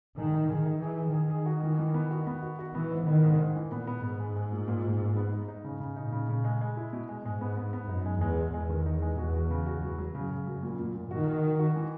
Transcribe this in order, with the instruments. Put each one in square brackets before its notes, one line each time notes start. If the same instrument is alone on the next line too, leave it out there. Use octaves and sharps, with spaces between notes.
[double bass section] D#3 [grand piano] G#3
[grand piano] D#4
[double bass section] D#3 [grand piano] G#4
[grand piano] D#4
[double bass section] E3 [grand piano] G#4
[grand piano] G#4
[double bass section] D#3 [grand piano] G#4
[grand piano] G#4
F#4
E3
E3
B3
F#4
B3
F#4
F#4
[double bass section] E3 [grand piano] B3
[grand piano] G#2
[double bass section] D#3 [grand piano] B3
[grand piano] G#2
G#2
E3
[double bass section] A#2 [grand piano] B3
[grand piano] B3
[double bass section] G#2 [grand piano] B3
[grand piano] G#3
G#3
A#2
A#2
A#2
A#2
B3
D#4
D#4
C#3
C#3
[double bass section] A#2 [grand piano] D#4
[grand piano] C#3
C#3
G#3
G#3
E4
B2
G#3
[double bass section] G#2 [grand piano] G#3
[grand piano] B3
B3
B3
[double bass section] F#2 [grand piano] D#4
[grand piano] G#3
[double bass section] E2 [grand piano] G#3
[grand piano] G#4
[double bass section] E2 [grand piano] G#3
[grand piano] D#3
D#4
G#3
[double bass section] E2 [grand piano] F#4
[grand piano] F#4
C#3
F#4
[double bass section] E2 [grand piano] F#3
[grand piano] F#3
[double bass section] F#2 [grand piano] C#3
[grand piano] C#3
F#3
A#2
A#2
A#2
[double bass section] D#3 [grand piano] F#4
[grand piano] F#4
F#4
F#4
E3